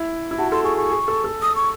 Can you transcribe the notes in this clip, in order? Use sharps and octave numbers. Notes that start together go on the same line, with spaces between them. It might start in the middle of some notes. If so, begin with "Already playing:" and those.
Already playing: E4
E4
F#4 A5
A4 C6
G#4 C#6
G#4 C#6
G#4
A4
A4
D#6
C#6